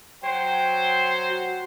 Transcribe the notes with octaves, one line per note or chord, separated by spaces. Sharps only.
F#3 C5 G5
F#4